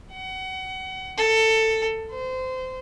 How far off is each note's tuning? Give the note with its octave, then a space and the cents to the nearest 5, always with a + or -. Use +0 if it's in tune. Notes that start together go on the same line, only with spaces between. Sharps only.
F#5 +30
A4 +15
C5 -25